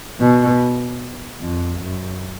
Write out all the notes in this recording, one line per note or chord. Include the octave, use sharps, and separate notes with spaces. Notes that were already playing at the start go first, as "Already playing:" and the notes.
B2
F2
F#2